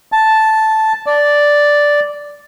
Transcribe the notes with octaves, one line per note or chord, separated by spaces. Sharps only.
A5
D5